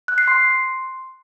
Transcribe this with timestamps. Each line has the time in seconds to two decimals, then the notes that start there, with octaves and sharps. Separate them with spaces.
0.08 F#6
0.18 C7
0.28 C6